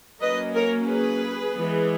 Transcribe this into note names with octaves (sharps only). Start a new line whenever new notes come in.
F#3 A#3 C#4 B4 D#5
A#4 C#5
G#4 B4
E3 G#3 B3